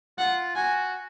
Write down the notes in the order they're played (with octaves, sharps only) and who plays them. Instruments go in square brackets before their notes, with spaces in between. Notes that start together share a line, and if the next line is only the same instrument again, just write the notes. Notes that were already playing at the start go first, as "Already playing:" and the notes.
[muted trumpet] F4 [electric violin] F#5
[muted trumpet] F#4 [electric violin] G#5